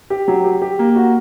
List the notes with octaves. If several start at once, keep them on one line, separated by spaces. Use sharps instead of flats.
G4
F#3
G4
G4
A#3
F#4